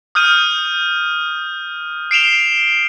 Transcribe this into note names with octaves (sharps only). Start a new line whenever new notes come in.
D#6 F6 G6 D#7
C7 D7 E7 F7 G7